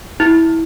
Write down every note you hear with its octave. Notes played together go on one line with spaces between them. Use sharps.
E4